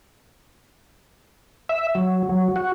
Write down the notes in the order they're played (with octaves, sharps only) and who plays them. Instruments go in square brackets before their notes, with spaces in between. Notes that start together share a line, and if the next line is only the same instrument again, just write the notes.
[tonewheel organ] E5
F#3
F#3
F#4